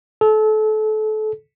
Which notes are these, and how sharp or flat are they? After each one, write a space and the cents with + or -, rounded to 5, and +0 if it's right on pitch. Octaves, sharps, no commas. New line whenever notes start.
A4 -30